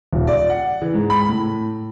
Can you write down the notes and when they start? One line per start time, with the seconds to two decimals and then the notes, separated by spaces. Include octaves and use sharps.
0.13 D#1
0.27 D5
0.50 F#5
0.82 E3
0.94 G#2
1.10 B5
1.29 A2